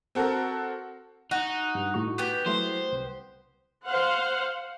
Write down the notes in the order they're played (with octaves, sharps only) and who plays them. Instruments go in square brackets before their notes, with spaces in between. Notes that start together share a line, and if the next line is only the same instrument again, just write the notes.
[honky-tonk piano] C4 F#4 A4 A#4
[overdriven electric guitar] D#4 [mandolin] F#4
[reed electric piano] G2
A2 F#4 C#6
[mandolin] B3 G4 [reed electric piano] B4
[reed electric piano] F#3 A3 E4 [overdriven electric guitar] C5
[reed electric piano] C2
[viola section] C5 F5 F#5